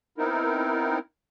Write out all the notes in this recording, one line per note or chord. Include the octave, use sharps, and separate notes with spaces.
B3 C4 D#4 E4 A#4